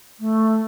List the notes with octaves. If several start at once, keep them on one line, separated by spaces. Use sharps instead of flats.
A3